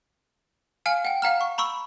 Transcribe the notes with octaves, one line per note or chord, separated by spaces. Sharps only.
F5 G#5 F6 C#7
F#5 G5
F5 F#5 A#5 F6
C#6
A#5 B5 C#6 E6